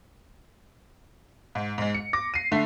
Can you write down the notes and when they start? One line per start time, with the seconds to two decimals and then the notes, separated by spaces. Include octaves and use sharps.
1.55 G#2
1.78 G#2 G#3
1.94 C#7
2.13 D6 A#6
2.34 C7 D#7
2.52 D3 A3